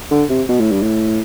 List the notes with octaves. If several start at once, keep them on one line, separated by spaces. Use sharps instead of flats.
D3
C3
B2
A2
G2
A2